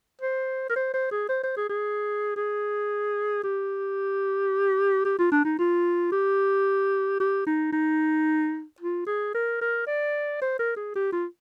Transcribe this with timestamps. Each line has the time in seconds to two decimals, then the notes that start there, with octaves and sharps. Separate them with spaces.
0.22 C5
0.70 A#4
0.76 C5
0.94 C5
1.11 G#4
1.29 C5
1.43 C5
1.57 G#4
1.69 G#4
2.36 G#4
3.44 G4
5.05 G4
5.19 F4
5.32 D4
5.45 D#4
5.59 F4
6.12 G4
7.20 G4
7.46 D#4
7.72 D#4
8.81 F4
9.06 G#4
9.35 A#4
9.61 A#4
9.87 D5
10.42 C5
10.59 A#4
10.76 G#4
10.95 G4
11.13 F4